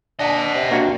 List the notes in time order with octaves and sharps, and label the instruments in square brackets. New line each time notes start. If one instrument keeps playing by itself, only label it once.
[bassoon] D4 [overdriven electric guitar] D#5 F#5 [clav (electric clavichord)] G#5 A5
[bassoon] C3
[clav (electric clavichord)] A#3 D4 F#4